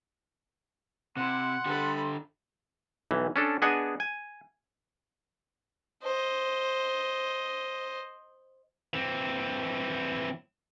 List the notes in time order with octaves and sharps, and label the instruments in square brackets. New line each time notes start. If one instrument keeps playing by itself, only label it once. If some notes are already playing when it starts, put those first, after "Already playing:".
[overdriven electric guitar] C3 [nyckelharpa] E4 [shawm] F#5 [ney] C6
[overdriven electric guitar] D3 G4 [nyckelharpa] A4 B5
[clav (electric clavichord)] B1 E3
C#4 D4 A4
B3 D4 G#4 D#5 F#5 G#5
G#5
[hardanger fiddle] C5 D#5
[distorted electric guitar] E3 C4